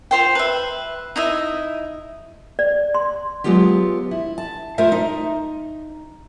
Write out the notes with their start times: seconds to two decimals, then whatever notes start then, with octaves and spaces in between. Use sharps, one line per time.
0.11 F4 C5 G5
0.35 B4 E5
1.16 D#4 E4 D#5 E5
2.59 D5
2.95 C6
3.44 F#3 G#3 B3 F4 G4
4.11 E4
4.38 A5
4.78 A3 F4 A#4 C5 E5
4.92 D#4